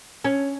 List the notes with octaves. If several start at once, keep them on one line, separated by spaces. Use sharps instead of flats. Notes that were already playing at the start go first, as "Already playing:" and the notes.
C#4